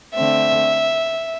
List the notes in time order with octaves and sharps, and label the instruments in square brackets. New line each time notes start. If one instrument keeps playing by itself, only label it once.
[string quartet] D3 A3 C4 E5